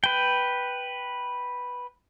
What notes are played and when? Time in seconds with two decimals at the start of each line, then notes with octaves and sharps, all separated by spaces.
0.04 B4 G5